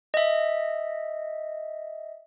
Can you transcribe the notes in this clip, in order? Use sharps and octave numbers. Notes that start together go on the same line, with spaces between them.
D#5 E5